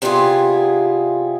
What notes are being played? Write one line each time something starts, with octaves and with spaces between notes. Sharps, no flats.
C3 G3 B3 E4 F4 G#4